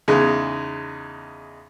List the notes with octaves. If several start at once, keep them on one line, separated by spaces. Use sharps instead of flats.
E2 C#3 G#3 D#4